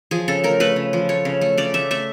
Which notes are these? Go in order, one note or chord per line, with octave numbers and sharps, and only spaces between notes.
F3 G#4
C#3 A4
A3 A#4
A3 B4
C#3
F3
A3 C#5
C#3
A3
C#3 D5
A3 E5
A3 E5